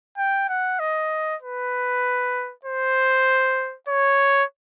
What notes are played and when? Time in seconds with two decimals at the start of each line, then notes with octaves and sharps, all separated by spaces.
0.18 G5
0.49 F#5
0.80 D#5
1.42 B4
2.65 C5
3.88 C#5